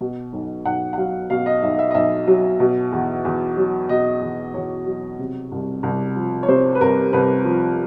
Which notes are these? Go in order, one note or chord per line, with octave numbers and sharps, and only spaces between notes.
B2
B1
B1 F#5
F#5
F#3 F5
B2 F5
D#5
B1 E5
D#5
E5
D#5
B1 E5
F#3
B2
E2
E2
F#3
B2 D#5
E2
E2 C#5
F#3
C3
C2
C2
F3
C#5
C3 C5
B4
C2 A#4
C2 B4
F3